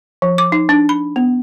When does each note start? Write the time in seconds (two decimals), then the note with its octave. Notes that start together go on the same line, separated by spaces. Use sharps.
0.22 F3
0.38 D6
0.52 D#4
0.69 D4
0.89 B5
1.16 B3